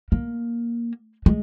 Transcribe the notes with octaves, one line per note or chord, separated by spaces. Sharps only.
A#3
G#3